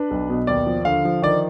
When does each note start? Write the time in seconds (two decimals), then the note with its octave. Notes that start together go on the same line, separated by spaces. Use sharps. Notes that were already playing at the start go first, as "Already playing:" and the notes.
Already playing: D4 B4
0.11 B1
0.30 B2
0.47 D#2 D5
0.67 F3
0.85 D3 F5
1.05 F3
1.22 D#3 D5